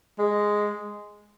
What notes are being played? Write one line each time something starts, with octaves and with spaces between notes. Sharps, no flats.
G#3